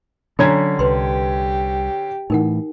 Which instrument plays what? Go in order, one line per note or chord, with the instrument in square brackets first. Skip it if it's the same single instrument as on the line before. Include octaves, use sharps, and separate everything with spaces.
[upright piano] D3 C#4 G#6 [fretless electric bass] F#3 D4 [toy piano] G#5 A#5
[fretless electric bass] C2 [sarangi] G4 [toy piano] B4 C6
[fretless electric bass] A2 E3 [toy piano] D#4 A#4 F#5